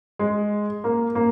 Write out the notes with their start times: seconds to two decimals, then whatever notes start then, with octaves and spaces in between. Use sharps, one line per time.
0.19 G#3
0.84 A#3
1.15 A#3